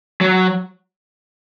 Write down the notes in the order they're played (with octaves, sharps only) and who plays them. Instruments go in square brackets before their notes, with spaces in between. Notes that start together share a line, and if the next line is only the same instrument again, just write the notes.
[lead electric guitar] F#3